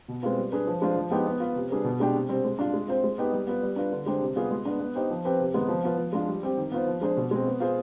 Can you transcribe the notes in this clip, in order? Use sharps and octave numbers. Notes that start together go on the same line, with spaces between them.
B2
G#3 C4 F4 B4
G3
D4 G#4 B4
F3
G#3 D4 F4 C5
F3
G#3 B3 D#4 G4
B3
F4 B4
C3
G3 D4 G#4 B4
B2
G#3 D4 G4
C3
G3 C4
G#3
D4 F4
G#3
C4 F4 C5
G#3
B3 D#4 G4 B4
G3
B3 F4 B4
G3
D4 F4 B4
D3
G#3 D4 G4 C5
C3
G3 B3 F4 G#4
G#3
B3 D4
B3
D#4 G4 C5
F3
C4 G4 B4
C3
D#3 G#3 B3 D#4
F3
B3 F4 B4
F3
G#3 D4 F4
G3
C4 G4
D#3
B3 F4 C5
F3
G#3 D4 G#4 C5
B2
G#3 C4
B3
F4 G#4 C5